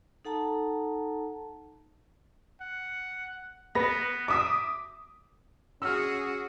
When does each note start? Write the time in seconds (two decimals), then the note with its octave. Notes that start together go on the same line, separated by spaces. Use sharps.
0.25 D#4 A4 F#5 A5 A#5
2.61 F#5
3.75 B3 B4 A#6
4.28 E5 D6 D#6 B6
5.82 C#4 F#4 G#4 E6 F6